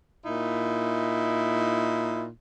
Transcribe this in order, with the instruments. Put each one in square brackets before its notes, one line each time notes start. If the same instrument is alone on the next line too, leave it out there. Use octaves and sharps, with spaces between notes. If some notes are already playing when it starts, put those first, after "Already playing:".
[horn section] A#2 D#4 E4